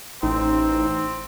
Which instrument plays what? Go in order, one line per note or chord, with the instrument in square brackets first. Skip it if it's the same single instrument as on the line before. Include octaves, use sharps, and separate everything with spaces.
[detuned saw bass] A1 [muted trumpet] C4 [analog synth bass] D#4